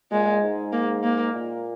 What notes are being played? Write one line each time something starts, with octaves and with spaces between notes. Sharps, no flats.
A#2 G#3
G#2
A#3
A#3
A#2